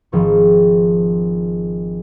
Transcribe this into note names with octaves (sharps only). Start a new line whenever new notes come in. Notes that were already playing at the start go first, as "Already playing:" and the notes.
G#1 F3 C#6